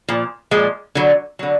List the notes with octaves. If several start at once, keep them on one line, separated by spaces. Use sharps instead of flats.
A#2 F3
A#2 F3 G#3
D3 F#3
D3 F#3